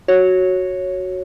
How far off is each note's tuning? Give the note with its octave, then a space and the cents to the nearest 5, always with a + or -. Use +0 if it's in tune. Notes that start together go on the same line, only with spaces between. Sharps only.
F#4 +0 C#5 -5